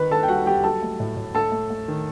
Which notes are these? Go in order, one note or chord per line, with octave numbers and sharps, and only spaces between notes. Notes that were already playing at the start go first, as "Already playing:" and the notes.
Already playing: D#3 B4 B5
D#3 A4 A5
G5
G3 F#4 F#5
G3 G4 G5
F#3 A4 A5
A3
A2
A2
A3 A4 A5
A3
A3
D#3